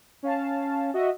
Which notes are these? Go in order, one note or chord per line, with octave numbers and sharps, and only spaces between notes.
C#4 F5 A5
F#4 D#5 E5